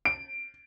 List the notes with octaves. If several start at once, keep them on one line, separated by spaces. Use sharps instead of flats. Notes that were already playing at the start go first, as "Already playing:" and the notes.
D7